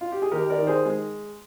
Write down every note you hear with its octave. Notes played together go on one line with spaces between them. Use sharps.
F4
G4
G#4
D#2 G4 A#4
A#4 D5
D#3
G#4 C5
G#3